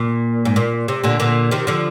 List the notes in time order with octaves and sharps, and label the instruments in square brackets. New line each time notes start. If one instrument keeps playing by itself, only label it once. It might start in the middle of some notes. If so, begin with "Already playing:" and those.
Already playing: [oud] A#2
G#2
A#2
C3
A#2 D3
A#2 D3
C3 D#3
D3 F3